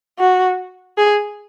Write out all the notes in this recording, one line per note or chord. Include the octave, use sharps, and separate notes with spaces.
F#4
G#4